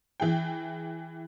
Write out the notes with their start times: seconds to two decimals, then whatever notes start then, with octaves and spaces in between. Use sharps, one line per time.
0.20 E3 G#4 G5